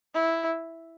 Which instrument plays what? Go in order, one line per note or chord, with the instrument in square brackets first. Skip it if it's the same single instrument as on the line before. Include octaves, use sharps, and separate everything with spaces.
[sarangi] E4